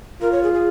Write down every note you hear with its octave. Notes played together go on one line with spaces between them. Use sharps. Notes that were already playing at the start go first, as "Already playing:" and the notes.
F4 A#4
C#5
G#4
G#4